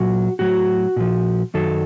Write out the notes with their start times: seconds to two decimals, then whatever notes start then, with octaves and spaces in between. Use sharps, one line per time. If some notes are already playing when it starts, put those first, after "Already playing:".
Already playing: A#2 F#3 F#4
0.39 A2 F#3 F#4
0.96 A#2 F3
1.54 F#2 D#3 F#3 A4